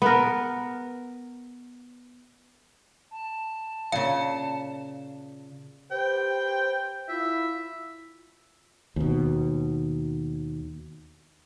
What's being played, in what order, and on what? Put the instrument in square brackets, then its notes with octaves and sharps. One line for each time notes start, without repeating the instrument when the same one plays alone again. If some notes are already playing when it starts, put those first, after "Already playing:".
[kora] B3 A#4
[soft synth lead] A5
[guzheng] A#2 C#3 [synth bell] F5
[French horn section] G4 B4 C5 [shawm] G5
[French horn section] E4 F4 [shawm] E5
[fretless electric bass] D#2 B2